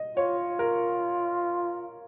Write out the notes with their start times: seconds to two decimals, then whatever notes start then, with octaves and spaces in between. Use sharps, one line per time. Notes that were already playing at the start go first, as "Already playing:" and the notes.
Already playing: D#5
0.17 F4 C#5
0.59 A#4